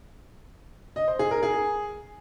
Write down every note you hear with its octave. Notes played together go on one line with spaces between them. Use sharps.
D#5
C5
G#4
A#4
G#4